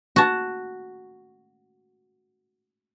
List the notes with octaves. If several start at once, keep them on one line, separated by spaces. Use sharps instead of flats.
F#4 A5